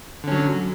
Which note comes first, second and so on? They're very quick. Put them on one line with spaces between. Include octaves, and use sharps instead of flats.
D3 C#4 F#3